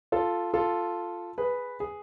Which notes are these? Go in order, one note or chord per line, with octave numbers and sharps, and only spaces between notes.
F4 A4
F4 A4
G#4 B4
G#4